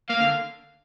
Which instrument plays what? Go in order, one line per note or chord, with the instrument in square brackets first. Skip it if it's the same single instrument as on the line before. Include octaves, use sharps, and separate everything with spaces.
[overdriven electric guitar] A#3 [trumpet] F5
[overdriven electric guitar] D3